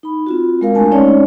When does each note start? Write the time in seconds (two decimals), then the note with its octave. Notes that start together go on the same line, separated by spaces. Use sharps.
0.03 D#4 B5
0.27 C4 F4 F#4
0.61 G#3 A#4 F5
0.75 A3 D4 G#5 A5
0.91 G#3 C4 C#4 D#4 C#5 D5